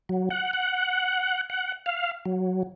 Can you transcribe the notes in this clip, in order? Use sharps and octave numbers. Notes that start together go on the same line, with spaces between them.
F#3
F#5
F#5
F#5
F5
F#3